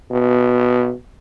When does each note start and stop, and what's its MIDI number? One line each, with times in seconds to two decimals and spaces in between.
0.11 0.92 47